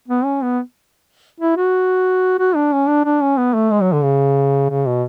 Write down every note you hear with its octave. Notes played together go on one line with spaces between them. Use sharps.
B3
C#4
B3
E4
F#4
F#4
D4
C#4
D4
D4
C#4
B3
A3
G#3
F#3
D3
C#3
C#3
B2